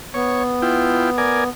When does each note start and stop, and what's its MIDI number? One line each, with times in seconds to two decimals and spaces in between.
0.14 1.49 59
0.14 0.43 73
0.62 1.10 64
0.62 1.10 65
0.62 1.10 79
1.18 1.44 70
1.18 1.44 74
1.18 1.44 80